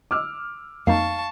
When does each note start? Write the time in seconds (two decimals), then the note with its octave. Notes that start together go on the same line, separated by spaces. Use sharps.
0.11 D6 E6 F6
0.87 F2 A#3 D#4 F5 A5 C#6